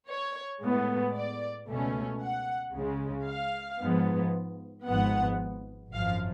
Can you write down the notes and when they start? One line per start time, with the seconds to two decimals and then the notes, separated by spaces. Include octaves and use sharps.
0.08 C#5
0.62 A2 G#3 B3
1.15 D5
1.67 C#2 B2 A3 C#4
2.21 F#5
2.74 C#2 C#3 G#3
3.27 F5
3.80 G#2 F3 B3
4.87 G#1 G#2 F3 B3 F#5
5.93 G#1 F#2 F3 F5